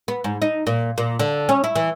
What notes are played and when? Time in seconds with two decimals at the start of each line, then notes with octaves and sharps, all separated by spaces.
0.08 B3
0.24 G#2
0.42 D#4
0.67 A#2
0.98 A#2
1.19 D3
1.49 C#4
1.64 E4
1.75 E3